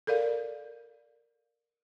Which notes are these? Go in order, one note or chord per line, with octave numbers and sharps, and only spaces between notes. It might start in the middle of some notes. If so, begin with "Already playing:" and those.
A4 A#4 D5 F5